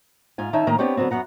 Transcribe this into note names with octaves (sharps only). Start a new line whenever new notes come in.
G#2 F4 G#5
D#3 C#4 D#4 E5 G#5 A5
A2 D#3 A#3 A#4
B3 C4 D4 G4 C#5
D3 F#3 B3 C4
F#2 B3 F#5 A#5